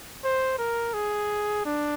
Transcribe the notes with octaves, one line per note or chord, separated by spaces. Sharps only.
C5
A#4
G#4
D4